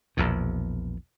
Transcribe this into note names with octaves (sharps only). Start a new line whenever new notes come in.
A#1 E2 B2